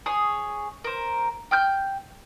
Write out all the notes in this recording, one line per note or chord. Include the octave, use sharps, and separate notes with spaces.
G#4 C#5
A#4 C5
G5 F6 G6